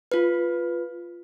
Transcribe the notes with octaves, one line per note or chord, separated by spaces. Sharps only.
F4 B4